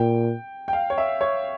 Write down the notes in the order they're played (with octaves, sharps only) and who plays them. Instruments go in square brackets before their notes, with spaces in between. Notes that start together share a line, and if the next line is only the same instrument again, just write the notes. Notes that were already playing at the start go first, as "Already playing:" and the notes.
Already playing: [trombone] A#2 [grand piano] G5
[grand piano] G5
F5
C#5
E5
C#5